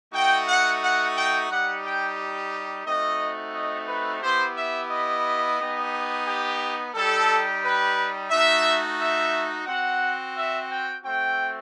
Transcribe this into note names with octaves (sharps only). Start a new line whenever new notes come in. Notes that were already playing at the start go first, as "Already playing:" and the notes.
A3 D#4 F#4 G5
F#5
F#5
G5
G3 D#4 G4 F#5
G5
A3 C4 D#4 F#4 D#5
D#5
B4
B3 E4 G4 C5
E5
D#5
B3 D#4 G4
G4
G3 D#4 G4 A4
B4
A3 D#4 F#4 E5
E5
C4 F#4 F#5
E5
G5
A3 C4 F#4 G5